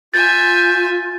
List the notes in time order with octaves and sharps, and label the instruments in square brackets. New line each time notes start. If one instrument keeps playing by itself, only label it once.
[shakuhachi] F4 [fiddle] E5 G#5 [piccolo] G6 [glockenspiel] A6